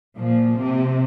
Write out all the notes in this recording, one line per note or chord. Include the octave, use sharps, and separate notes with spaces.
A#2 F3
C3